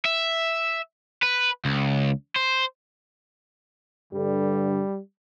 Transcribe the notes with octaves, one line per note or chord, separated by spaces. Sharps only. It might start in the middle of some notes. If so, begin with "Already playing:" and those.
E5
B4
C#2
C5
G2 D3 G3